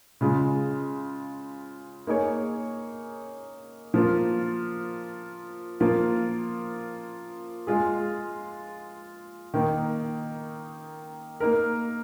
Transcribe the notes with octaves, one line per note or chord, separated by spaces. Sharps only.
C#3 G#3 F4
A#3 D#4 G#4 C#5
F3 A#3 F4
F3 A#3 F4
G#3 F4 G#4
D#3 A#3 D#4
A#3 D#4 A#4